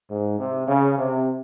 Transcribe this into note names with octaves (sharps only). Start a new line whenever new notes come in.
G#2
C3
C#3
C3